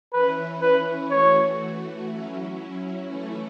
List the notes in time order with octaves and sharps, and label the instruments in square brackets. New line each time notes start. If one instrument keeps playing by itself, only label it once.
[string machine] E3 C#4 E4 [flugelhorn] B4
[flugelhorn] B4
[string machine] E3 A3 F#4 [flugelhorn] C#5
[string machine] F#3 C#4 E4
E3 A3 C#4 E4